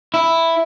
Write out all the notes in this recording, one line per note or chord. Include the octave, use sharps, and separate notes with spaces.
E4